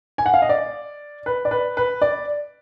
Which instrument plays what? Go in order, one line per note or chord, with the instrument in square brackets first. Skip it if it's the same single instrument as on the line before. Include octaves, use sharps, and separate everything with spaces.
[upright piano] G#5
F#5
F5
D#5
D5
B4
D5
B4
B4
D5